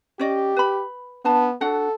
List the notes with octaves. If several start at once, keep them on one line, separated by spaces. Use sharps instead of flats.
C#4 G4 D5 D#5
B4 B5
B3 D4 A5
D4 F#4 A4 F#5